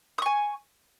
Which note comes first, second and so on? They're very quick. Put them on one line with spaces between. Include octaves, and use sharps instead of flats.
D#6 C#6 G#5